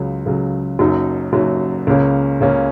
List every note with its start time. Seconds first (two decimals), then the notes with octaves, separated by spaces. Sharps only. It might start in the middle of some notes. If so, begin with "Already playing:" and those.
Already playing: C#2 C#3 F#3
0.26 C#2 C#3 F#3
0.79 F#1 F#2 F#3 D#4
1.33 F#1 F#2 F#3 D#4
1.87 C#2 C#3 A#3 C#4
2.41 C#2 C#3 A#3 C#4